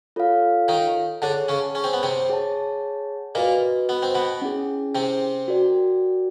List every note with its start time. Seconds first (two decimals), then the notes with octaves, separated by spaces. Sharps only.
0.16 F4 A4 C#5 F5
0.68 D#3 D#4
1.22 D3 D4 G#4 C#5 F#5 A5
1.48 C#3 C#4
1.75 C#4
1.84 C4
1.93 B3
2.03 C3 C4
2.29 G#4 C#5 F#5 A5
3.35 A#2 A#3 F#4 B4 D#5
3.89 B3
4.03 C4
4.15 B2 B3
4.42 C#4 E4 G#4
4.95 C3 C4
5.48 F#4 A#4 D5 G5